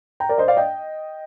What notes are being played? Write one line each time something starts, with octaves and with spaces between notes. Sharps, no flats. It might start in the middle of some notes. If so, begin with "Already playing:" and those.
G5 A#5
A#4 D5
C5 D#5
D5 F5
D#5 G5